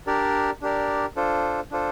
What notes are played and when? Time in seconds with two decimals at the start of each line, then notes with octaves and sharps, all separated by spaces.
0.07 D4 G4 A#4 D5
0.62 D4 G4 A#4 D5
1.16 D4 F4 A4 C5
1.71 D4 F4 A4 C5